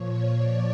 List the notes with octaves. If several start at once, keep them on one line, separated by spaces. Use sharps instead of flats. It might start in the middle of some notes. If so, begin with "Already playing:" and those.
Already playing: A#2 F3 C#5
D5